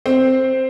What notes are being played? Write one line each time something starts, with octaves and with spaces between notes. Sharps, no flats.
C4